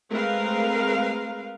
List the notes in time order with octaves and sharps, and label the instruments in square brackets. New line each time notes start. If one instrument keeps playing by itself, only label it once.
[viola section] G#3 A3 C4 A#4 B4 F5